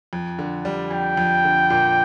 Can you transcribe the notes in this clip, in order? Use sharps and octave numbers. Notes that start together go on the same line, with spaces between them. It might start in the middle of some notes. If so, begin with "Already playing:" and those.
F2
D3
G3
F2 G5
F2
D3
A#2